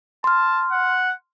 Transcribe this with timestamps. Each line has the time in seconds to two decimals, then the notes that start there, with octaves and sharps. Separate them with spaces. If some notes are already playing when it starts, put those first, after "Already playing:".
0.24 A5 C6 F6
0.71 F#5